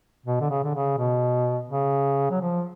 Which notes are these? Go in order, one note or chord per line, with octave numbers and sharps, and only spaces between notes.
B2
D3
C#3
D3
C#3
B2
C#3
F#3
F3